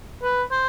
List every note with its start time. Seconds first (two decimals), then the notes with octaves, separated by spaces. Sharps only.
0.23 B4
0.51 C5